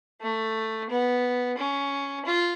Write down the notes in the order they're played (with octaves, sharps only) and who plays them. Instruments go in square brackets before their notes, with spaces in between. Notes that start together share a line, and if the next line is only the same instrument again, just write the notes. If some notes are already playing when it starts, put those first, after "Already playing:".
[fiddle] A3
B3
C#4
F4